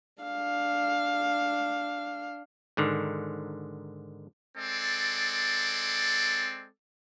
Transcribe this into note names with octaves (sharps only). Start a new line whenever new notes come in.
D4 F5
G#2 D3 D#3
G#3 C4 A4 D5